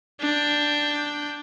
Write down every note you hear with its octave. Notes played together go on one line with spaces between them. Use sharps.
D4 G5